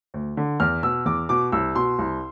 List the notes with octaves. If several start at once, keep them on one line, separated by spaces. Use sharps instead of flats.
D2
D3
E2 F6
B2 E6
E2 D6
B2 D6
C2 E6
B2 C6
C2